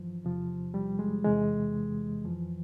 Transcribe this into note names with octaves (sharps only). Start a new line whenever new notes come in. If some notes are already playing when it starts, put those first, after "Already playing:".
Already playing: G2 E3 F3
E2 C3 F3
G3
G#3
E2 C3 E3 G#3
F2 E3 F3